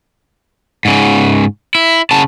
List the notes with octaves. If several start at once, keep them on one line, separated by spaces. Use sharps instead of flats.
G#2 C#3
E4
C#3 A5